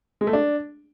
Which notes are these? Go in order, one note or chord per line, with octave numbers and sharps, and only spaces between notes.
G#3
A3
D4